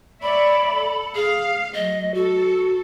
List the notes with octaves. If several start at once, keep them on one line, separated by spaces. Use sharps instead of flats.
C#5 D5 E5 B5
A4
G#4 F5
F#3 A3 D#5
F#4 A4